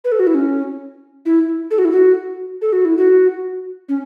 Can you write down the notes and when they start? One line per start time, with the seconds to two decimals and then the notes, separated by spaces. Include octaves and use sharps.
0.04 B4
0.12 A4
0.19 F#4
0.27 E4
0.34 C#4
1.26 E4
1.71 A4
1.78 F#4
1.85 E4
1.92 F#4
2.61 A4
2.73 F#4
2.85 E4
2.97 F#4
3.89 C#4